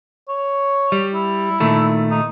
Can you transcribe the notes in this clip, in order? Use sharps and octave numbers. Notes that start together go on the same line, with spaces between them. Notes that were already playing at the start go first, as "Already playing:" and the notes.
C#5
G3
E4
A#2 D#3 A3
D#4